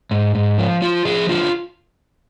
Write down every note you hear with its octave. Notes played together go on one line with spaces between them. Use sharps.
G#2
G#2
F3
F3 F4
F3 G#4
D3 F4